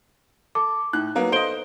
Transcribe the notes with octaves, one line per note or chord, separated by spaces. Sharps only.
A4 D6
A2 D#4 F#6
F#3 A#3 B3
A4 C5 D#5 D7 G7